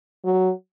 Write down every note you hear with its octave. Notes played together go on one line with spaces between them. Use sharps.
F#3